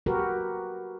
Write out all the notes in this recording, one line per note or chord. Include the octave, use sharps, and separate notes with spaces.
F#4 G4 A#4 B4